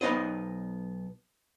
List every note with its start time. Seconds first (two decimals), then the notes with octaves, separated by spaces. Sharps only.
0.01 B1 B3 D#4 C5 D#5